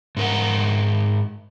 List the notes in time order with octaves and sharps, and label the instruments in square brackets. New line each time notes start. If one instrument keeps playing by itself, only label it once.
[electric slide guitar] G#2 A#4 F#5